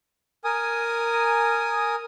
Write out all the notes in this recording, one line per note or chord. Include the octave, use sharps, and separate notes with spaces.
A#4 G#5 D#6